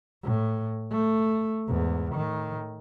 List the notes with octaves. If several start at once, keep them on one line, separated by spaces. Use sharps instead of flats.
A2
A3
E2 G#2
A2 D#3